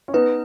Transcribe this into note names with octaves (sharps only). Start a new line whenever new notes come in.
C#4
B3 D#4 B4